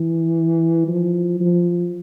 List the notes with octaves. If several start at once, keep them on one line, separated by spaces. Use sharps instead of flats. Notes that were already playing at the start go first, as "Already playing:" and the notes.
Already playing: E3
F3
F3